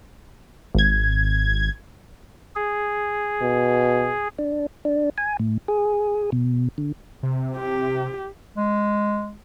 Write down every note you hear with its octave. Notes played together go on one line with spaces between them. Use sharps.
G#1 G#6
G#4
B2
D4
D4
G#5
A2
G#4
B2
D3
C3
G4
G#3